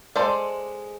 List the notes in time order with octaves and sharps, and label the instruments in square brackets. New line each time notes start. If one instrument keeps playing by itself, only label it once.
[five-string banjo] G#3 A4 C5 D5